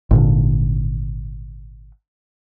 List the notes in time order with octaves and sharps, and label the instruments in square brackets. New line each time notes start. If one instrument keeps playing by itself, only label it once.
[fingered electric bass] G#1 A#2 D3